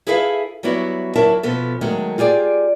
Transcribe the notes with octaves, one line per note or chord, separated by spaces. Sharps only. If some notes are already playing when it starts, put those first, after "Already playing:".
E4 G#4 A4 B4 E5 F5
F#3 G3 B3 E4 F#4
D2 F#3 E4 A#4 E5 A5
B2 F3 B3 A4
D#3 F#3 G#3 A3
F4 G4 G#4 D5